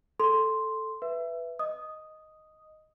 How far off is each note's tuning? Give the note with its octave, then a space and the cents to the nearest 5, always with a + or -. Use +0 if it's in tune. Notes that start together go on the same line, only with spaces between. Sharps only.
A4 +0 C6 +0
B4 +0 E5 +15
D#5 +0 D#6 +0